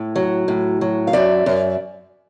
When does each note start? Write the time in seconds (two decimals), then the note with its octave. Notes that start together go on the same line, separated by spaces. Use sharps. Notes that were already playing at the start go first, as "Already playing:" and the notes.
Already playing: A2
0.16 F#3
0.48 A2
0.81 F#3
1.07 F5
1.13 F#2 D5 E5
1.46 F#2